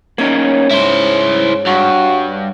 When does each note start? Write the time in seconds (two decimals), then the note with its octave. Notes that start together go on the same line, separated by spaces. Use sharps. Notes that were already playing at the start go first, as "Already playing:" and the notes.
0.18 A#3 C#4 D#4 C#5
0.71 G#2 C#4 E4 C5
1.66 G2 F#4